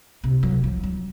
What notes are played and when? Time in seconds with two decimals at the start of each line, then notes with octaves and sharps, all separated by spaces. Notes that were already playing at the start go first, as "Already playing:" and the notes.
0.24 C3
0.43 F#3
0.64 F3
0.83 F#3